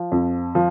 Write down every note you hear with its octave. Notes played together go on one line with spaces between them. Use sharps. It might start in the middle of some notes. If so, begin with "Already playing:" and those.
Already playing: F3
F2
F3